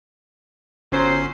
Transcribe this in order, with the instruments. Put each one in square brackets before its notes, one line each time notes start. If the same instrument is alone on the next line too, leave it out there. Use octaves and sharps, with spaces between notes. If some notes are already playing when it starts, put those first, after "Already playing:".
[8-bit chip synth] G1 C#4 C7 [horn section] F#3 C5